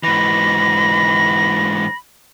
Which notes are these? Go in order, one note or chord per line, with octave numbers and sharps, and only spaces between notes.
G#2 E3 B5 A#6